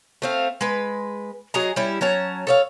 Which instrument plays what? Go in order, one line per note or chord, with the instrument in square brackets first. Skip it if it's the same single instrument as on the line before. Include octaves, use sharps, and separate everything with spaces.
[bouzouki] A3 C4 F5
G#3 B4
F#3 G#4 D#5 A#5
G3 C#4 E4
F#3 C#4 A5 A#5
A4 C#5 F5